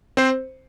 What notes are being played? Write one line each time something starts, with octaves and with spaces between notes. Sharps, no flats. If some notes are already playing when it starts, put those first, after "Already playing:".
C4 C5